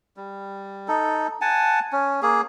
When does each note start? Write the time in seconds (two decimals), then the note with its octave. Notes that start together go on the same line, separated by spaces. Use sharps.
0.17 G3
0.88 D#4 A4
1.41 F#5 G#5 A5
1.92 C#4
2.22 A#3 G#4